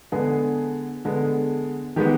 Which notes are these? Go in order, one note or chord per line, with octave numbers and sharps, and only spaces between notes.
D3 G#3 B3 G#4
D3 G#3 B3
D#3 G#3 B3 G4